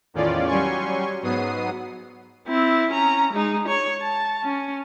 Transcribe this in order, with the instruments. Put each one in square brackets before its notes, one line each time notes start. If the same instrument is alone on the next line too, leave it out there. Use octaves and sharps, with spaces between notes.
[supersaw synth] E2 A2 D#3 C#4 F4 D5
F#3 G3 C#4 G#5 C6 C#6
G#2 F#3 B3 D#6 C7 D#7
[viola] C4 E4
C#4 A#5
G#3 D#4
C#5
A5
C#4